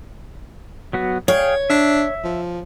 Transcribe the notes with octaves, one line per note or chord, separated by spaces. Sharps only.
F#3 B3 F#4
G#4 C#5 F5 G5
D4 E5
F3